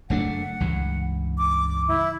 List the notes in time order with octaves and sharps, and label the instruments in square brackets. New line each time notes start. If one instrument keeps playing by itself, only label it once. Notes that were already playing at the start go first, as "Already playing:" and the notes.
[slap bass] F#1 A3 D4 [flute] F#5
[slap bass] C#2 G2 E3
[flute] D6
E4